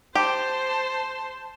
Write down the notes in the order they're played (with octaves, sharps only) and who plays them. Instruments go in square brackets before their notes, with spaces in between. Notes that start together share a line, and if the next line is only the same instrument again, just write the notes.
[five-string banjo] G4 [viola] C5 [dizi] A5